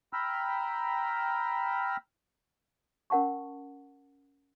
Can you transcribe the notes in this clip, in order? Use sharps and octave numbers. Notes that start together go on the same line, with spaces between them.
G5 A#5 B5 E6 F6
C#4 A#4 F#5 A5 C#6